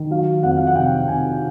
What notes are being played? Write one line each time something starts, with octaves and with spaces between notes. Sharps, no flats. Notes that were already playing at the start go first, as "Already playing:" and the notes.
Already playing: D#3
F#3 F5
F2 F#5
F5
F#5
C3 G5
C3 G#5